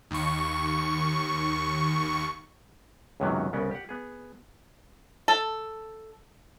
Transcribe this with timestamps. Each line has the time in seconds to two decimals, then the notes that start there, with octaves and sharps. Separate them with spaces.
0.11 D#2 C#6
3.20 C#2 F#2 C3 D#3 F#3 B3
3.53 C2 C#3 B3 C#4 D5
3.71 G4 F#5
3.89 B3 G#4
5.28 A4